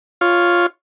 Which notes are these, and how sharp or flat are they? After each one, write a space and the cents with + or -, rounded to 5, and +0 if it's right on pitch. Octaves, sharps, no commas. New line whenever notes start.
F4 +0 C#5 +0